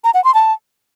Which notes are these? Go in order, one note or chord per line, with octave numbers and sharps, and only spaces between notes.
A#5
F#5
C6
A5